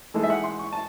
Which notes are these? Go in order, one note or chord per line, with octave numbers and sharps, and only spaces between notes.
E3 G#3 D#4 A4
E5
F#5
C6
C#6
A5